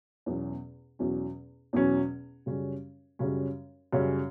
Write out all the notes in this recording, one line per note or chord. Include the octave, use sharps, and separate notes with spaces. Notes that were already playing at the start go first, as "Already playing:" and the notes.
E2 B2 F#3 C#4
E2 B2 F#3 C#4
E2 B2 F#3 C#4
F#2 C#3 G3 C#4
F#2 C#3 G3 C#4
F#2 C#3 G3 C#4